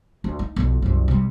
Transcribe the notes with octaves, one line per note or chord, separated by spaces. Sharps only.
D2
D#4
B1 F2
C2 F#2
C3 G3